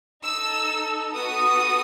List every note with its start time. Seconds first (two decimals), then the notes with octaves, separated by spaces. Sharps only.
0.22 D#4 A4 E6
1.13 B3 F#4 A4 D#6